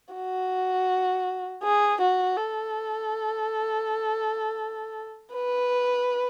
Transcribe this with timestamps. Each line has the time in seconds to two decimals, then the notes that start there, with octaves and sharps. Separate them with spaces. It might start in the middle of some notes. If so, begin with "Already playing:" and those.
0.14 F#4
1.64 G#4
2.01 F#4
2.37 A4
5.34 B4